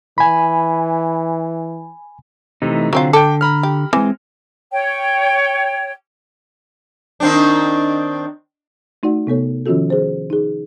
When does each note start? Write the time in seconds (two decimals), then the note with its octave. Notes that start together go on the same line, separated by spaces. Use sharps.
0.18 E3 G#5 B5
2.62 C3 E3 A3 D#4
2.93 D3 F#3 C4 F4
3.13 A4 G5 D6
3.41 A#5 B5 F6
3.63 G4
3.93 E3 G#3 C4
4.72 C#5 G5
7.20 D#3 C4 D4
9.03 A3 D#4 F#4 D5 F#5
9.27 C3 B3 A4 C#5
9.66 D#3 F3 C#4 F4 F#4 A4
9.90 G#4 C5
10.30 D#4 G#4